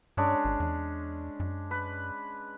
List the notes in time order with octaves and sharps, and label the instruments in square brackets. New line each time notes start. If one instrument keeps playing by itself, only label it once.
[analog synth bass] G2 [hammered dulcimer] G#3 C#4 D4
[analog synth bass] G#1
E2
F#2
[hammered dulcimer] B4